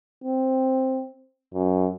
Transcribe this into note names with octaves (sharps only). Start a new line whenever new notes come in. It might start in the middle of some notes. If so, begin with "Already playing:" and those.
C4
F#2